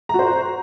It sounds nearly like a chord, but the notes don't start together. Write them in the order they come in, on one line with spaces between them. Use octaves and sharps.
A#5 F#4 C5